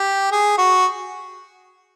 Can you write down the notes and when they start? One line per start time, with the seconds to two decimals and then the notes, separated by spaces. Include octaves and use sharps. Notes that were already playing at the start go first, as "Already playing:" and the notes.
Already playing: G4
0.31 G#4
0.58 F#4